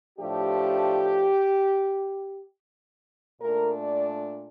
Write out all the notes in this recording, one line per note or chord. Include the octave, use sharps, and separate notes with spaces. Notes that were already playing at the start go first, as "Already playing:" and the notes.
A2 F3 A3 D4 G4
A#2 A3 D4 A#4
D5